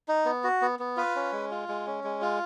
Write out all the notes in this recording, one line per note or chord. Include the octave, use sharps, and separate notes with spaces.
D#4
B3
F#4
B3
B3
F4 B4
C#4
G#3
F4
G#3
C#4
G#3
F4